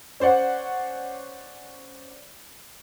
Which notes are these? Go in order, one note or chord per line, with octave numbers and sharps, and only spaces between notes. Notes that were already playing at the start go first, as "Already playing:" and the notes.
C#4 C5 D5 F#5